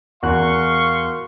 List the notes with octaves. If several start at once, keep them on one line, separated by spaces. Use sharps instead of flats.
E2 F#4 A#4 F5 C6 C#6 F#6